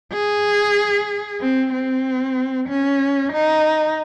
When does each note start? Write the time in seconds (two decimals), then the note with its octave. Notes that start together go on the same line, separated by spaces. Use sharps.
0.13 G#4
1.41 C4
1.74 C4
2.69 C#4
3.33 D#4